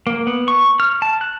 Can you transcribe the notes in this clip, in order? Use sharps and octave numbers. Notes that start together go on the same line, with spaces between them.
A#3
B3
C#6
F6
A5
F#6